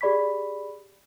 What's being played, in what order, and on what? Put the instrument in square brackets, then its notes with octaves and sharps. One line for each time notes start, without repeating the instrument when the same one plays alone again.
[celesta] G4 G#4 D5 B5 C#6 B6